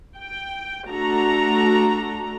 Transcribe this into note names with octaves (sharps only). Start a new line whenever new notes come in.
G5
A3 D4 F#4 A4 A#5